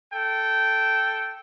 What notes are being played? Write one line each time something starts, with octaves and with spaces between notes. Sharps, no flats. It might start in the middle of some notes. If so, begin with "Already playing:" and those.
A4 G5